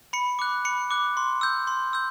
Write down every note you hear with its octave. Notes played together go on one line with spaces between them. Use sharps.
B5 C#7
D6 F#6
B5 C#7
D6 F#6
C6
E6 G6
C6
E6 G6